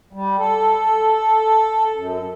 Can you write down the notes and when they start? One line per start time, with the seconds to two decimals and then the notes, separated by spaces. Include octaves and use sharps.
0.13 G3
0.39 A4
1.95 F#2